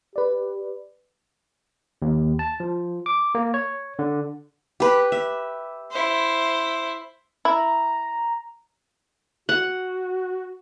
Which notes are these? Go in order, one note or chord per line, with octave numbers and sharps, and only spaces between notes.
G4 B4 D5
D#2
A5
F3
D6
A#3
C#5
D3
G4 B4
E5
E4 C5
E4 A#5
F#4 F#5